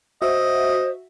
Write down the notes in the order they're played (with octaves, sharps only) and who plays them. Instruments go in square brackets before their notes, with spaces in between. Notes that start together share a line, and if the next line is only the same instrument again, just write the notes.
[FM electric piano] F#4 E5 [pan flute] C5 [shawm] D#5